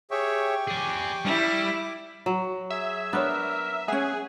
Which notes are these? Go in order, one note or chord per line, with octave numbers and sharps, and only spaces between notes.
G4 G#4 C#5 E5 G5 C#6
G#4 D5 D6
G3 E4
F#3
G#4 E5
B3 D4 A#4 C#5
C#4 G#4 E5 F#5